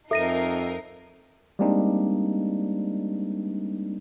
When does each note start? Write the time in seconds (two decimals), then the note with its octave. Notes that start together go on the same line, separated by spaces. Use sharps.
0.11 F2 D#4 A4 A#4 E5 A#6 C7 D#7
1.59 G3 G#3 A#3 C4 D4 D#4